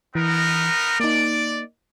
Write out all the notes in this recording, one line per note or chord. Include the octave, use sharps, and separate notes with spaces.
E3 B3 D#4 A#4
A#3 D#4 D5